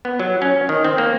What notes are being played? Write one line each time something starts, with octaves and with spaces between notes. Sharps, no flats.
B3
F#3
C#4
D#3
C4
A#3